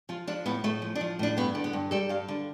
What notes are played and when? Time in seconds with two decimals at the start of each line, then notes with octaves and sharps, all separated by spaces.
0.09 F3 F4
0.27 F3 D4
0.46 A2 B3
0.64 A2 A3
0.82 F3
0.95 D4
1.01 F3
1.19 A2 D4
1.37 G2 B3
1.55 D3
1.64 B3
1.73 G2
1.91 G3 A4
2.09 G2 F5
2.28 D3